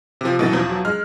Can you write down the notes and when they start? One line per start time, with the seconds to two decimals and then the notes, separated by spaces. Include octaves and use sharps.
0.21 C3 F3
0.39 B2 E3 F#3 B3 A6
0.53 E2 F3
0.69 F#3
0.85 G#3 F6